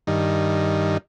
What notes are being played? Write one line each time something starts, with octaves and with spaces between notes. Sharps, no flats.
G2 D#3